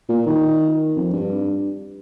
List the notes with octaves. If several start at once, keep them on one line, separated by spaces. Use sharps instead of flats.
A#2
D#3
F2
G2